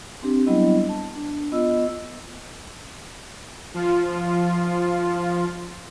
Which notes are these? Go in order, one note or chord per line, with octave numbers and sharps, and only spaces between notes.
C4 D4 G4
F#3 G3 B3 D4 E4 D#5
A5
D4
B3 F4 D#5 E6
F3 F4